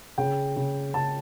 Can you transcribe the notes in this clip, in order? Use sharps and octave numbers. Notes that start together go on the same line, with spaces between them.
C#3 G5
C#3
C#3 A5